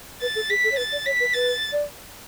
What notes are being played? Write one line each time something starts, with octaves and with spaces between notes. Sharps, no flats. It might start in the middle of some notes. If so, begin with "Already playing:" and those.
B4 A6
A4
G#4 B6
A4
C#5
B4 A6
D5
C#5 B6
B4
B4 A6
D5